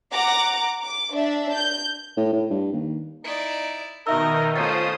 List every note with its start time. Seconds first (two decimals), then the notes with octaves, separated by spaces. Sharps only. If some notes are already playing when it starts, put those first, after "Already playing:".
0.11 F#5 A#5 D6
0.81 D6
1.15 D4 E5
1.54 G6
2.17 A2
2.33 A2
2.50 G2
2.73 D#2
3.24 D#4 E4 D5
4.07 B2 D#3 D#4 A#4 D#5 E5 E6
4.56 A3 C#4 F4 C5 D#6 A6